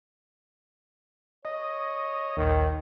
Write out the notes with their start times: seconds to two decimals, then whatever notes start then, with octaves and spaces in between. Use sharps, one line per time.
1.45 C#5 D#5
2.37 A#1 D#2 D#3